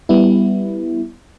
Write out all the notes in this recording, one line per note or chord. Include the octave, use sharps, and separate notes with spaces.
G3 B3 E4